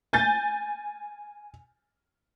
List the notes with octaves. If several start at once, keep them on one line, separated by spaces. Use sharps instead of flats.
G#5 G6 A6